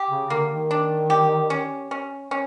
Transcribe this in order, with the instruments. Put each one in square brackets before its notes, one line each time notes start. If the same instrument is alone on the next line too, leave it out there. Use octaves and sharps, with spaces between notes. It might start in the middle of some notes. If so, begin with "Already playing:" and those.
Already playing: [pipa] G4
[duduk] C#3
[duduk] D3 [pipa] A#3
[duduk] D#3
[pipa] D4
G4
C#4
C#4
C#4